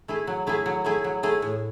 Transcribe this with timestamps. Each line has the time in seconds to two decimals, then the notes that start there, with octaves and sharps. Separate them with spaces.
0.08 A3 E4 G#4
0.27 F#3
0.47 A3 E4 G#4
0.66 F#3
0.85 A3 E4 G#4
1.04 F#3
1.23 A3 E4 G#4
1.42 A2